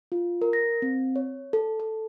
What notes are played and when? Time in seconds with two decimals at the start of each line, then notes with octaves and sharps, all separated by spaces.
0.12 F4
0.42 A#4
0.53 A#6
0.82 C4
1.16 C#5
1.53 A4
1.80 A4